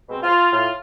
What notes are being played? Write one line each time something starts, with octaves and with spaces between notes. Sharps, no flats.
B2 G#3 C4
F4
A2 F4